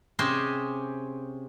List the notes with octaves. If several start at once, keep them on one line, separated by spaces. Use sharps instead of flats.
C3 C#4 G4 G#4 C5 D#5